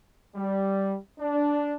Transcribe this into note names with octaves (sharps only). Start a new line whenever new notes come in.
G3
D4